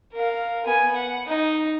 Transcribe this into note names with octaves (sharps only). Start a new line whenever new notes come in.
A#4 F5
B3 G#5
F#5
D#4